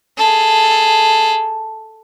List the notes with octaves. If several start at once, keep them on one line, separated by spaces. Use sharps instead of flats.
G#4 A4